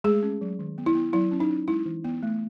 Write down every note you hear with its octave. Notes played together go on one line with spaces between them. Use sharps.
G#3 A3 G#4
C#4
F#3
D#3
B3
E4
B3
F#3 E4
C#4
D#4
C#4
G#3 E4
E3
B3
A3